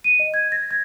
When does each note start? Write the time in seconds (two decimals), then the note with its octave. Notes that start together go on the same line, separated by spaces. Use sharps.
0.04 D#7
0.19 D#5
0.34 G#6
0.52 A#6
0.71 G#6